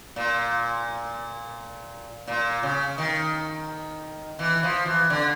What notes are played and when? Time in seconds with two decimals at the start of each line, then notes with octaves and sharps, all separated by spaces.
0.16 A#2
2.27 A#2
2.63 C#3
2.98 D#3
4.39 E3
4.63 F3
4.86 E3
5.10 D3